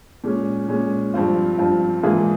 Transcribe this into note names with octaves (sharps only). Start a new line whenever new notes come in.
A#2 G#3 C#4
A#2 G#3 C#4
G2 F3 C4 F4
G2 F3 C4 F4
G#2 E3 A#3 F4 G#4